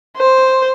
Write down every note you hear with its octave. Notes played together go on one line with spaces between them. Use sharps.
C5